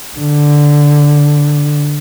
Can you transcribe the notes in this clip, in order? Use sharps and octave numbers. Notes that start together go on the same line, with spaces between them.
D3